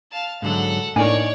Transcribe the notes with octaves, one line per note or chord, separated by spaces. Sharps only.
F5 A5
G#2 D3 F#3 A4 F#5
A2 A#3 D4 D#4 A#4 C#5 D5 G#5